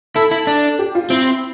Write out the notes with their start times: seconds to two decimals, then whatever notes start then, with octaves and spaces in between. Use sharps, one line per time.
0.15 E4 A4
0.31 E4
0.47 D4
0.79 G4
0.95 F4
1.10 C4 E4